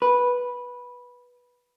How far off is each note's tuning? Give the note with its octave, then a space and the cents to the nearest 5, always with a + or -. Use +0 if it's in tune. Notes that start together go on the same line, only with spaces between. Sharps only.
B4 -10